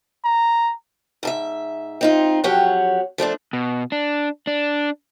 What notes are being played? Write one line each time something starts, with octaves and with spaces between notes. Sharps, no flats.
A#5
G#2 A4 E5
C4 D#4 F4
F2 F#3 G4 C#5 F#5
F3 A3 C#4 D4
B2
D4
D4